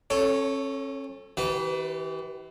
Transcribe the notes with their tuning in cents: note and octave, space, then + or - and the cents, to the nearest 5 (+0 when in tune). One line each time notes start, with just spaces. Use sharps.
C#4 -40 A4 +0 C#5 +0
E3 -40 G4 -35 B4 +25